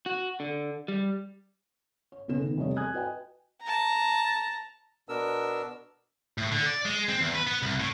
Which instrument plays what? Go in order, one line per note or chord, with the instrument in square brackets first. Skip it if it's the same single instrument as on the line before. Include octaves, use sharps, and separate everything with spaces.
[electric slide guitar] F#4
D3
G3
[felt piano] C#5
F#1 B2 B3 C#4 A4 E7
D#3
F1 E2 G3 C#5 D#5
G#5 D#6 F#6 G#6
F#4 B4 D#5 G5 G#5
[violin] A5 A#5
[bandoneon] B2 B3 D4 A#4 E6
[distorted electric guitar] A2
D3
D5
G#3
C4
E2
B4
B3
C2
A2